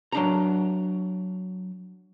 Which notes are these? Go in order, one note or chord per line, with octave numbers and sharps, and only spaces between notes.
F#3 D4 A#5